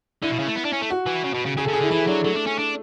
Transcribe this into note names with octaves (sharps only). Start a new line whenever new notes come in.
D3 E4
B2
C#3
A3
B3
D4
C#4
A3
F#4
E3
C#3
B2
C#3
C#3 G#4
A4
C#3
G#4
D3 E4
E3 E4
F#3 D4
F#3 A3
D4
C#4
D4